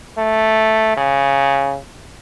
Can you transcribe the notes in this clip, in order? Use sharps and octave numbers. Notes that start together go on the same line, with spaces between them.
A3
C#3